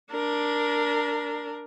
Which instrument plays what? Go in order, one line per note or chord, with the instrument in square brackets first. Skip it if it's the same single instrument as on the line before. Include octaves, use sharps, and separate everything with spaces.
[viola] D4 A#4